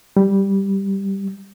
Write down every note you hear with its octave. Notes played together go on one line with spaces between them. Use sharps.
G3